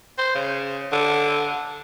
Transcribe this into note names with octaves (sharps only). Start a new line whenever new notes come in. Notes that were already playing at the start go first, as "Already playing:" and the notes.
C5
C#3
D3